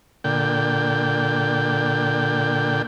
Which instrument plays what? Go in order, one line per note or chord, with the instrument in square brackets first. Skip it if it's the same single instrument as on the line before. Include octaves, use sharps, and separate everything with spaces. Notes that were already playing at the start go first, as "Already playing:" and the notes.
[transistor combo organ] A#2 D3 G5